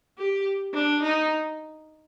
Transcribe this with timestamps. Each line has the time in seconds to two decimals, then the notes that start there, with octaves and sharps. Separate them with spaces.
0.18 G4
0.74 D4
1.03 D#4